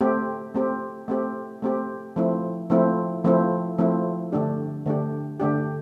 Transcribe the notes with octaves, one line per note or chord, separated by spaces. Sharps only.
A3 C4 G4
A3 C4 G4
A3 C4 G4
A3 C4 G4
F3 A3 C4 E4
F3 A3 C4 E4
F3 A3 C4 E4
F3 A3 C4 E4
D3 A3 D4 G4
D3 A3 D4 G4
D3 A3 D4 G4